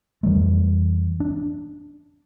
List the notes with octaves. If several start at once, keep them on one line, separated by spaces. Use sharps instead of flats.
F2 E3 G3 A3
D4